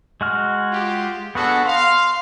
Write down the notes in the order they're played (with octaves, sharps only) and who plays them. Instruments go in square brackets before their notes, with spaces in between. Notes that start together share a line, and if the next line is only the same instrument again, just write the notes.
[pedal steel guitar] G#3 F#4 F6
[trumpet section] F4 G4
[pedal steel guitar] B3 F#4 [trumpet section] D4 G#4 A4
[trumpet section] F5 [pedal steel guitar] C6